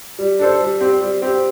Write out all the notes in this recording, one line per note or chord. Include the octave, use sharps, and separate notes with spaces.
G3
D4 A4 C5
G3
C4 G4 C5
G3
C4 G4